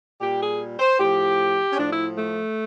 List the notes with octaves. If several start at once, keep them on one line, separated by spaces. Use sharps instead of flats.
A#2 G3 G4
G#4
C5
A2 F3 G4
C#4
A2 F3 D4
E4
A3